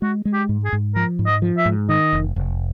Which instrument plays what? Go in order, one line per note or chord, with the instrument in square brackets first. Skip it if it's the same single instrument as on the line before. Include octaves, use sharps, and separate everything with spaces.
[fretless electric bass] G#3 [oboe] F#4
[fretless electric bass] G#3
[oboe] G4
[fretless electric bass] G#2
[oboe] G#4
[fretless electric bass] G#2
[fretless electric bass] F3 [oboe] A#4
[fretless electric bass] G#2
[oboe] D#5
[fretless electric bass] F3
[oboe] E5
[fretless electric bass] G#2
[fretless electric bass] D#3 [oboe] D#5
[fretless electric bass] F1
F1